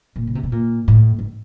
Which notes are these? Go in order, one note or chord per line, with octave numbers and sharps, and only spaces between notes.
A#2
C#3
C3
B2
A#2
A2
G#2